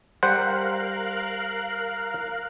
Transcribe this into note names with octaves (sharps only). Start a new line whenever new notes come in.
G3 A#4 C5 F5 F#5 F#6